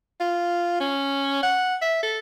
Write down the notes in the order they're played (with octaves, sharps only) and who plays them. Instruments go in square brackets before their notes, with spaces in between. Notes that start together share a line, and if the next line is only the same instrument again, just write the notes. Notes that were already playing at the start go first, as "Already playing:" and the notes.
[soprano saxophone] F4
C#4
F#5
E5
A4